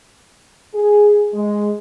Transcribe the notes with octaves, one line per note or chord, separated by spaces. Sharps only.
G#4
G#3